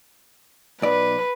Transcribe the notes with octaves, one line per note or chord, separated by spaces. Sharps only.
B1 B4 D5